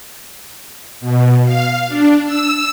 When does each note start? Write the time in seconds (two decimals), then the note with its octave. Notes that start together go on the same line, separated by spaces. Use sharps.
1.00 B2
1.45 F5
1.87 D4
2.25 E6